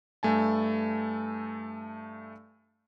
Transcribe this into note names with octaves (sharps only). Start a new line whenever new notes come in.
G2 A3 G#5 A5